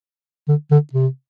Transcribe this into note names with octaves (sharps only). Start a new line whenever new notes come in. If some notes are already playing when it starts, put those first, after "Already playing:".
D3
D3
C3